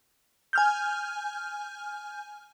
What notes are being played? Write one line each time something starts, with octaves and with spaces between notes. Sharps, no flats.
G#5 F6 G6